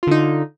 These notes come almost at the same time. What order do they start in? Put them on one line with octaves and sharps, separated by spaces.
F4 D3 D#4